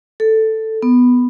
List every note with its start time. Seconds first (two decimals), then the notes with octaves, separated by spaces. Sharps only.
0.20 A4
0.83 B3